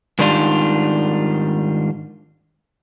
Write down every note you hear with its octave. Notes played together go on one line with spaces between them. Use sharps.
G#2 D#3 G3 D4 F4